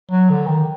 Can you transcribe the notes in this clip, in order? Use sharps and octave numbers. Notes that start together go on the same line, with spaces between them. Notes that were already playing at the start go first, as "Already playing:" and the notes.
F#3
D3
D#3